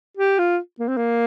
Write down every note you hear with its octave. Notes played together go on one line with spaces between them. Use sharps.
G4
F4
A#3
C4
A#3